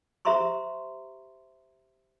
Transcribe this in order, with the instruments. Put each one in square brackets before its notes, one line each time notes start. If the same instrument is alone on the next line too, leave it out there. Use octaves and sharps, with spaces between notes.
[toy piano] G4 C5 E5 A#5 C6 C#6